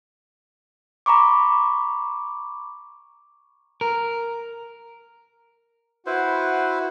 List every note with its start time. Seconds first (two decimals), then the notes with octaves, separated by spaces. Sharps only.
1.06 A#5 B5 C#6 D6
3.81 A#4
6.06 E4 F#4 B4 C5 F#5